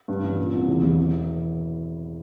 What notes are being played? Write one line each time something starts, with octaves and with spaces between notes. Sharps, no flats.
G2
A1
A#2
C2
E2
E1
E3